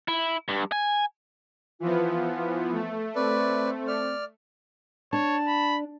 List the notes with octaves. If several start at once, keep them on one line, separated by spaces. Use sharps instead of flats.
E4
G2
G#5
E3 F3 B3 F4
A3
C4 B4 D5
D5 F6
D4 C#5 A5
B5